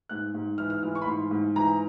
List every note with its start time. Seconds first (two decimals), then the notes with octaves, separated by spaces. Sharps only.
0.09 G#2 F#6
0.34 G#2
0.58 E3 F6
0.70 F6
0.83 E3 F6
0.95 C#6
1.02 B5
1.07 G#2 C6
1.31 G#2
1.56 E3 A#5